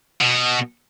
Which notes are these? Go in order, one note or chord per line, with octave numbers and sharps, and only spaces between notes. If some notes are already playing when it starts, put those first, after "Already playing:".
B2